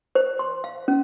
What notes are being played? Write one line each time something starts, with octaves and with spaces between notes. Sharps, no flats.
C5
C6
F5
C#4